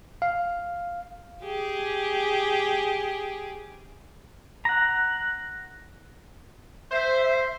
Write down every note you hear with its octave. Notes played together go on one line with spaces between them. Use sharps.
F5
G4 G#4
F#5 A#5
C5 E5